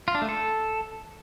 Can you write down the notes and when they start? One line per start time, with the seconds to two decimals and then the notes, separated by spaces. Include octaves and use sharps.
0.08 F4
0.15 D4
0.22 A3
0.29 A4